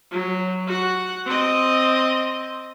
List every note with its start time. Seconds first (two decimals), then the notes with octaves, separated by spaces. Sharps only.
0.12 F#3
0.67 F#4 F#5
1.26 C4 D#5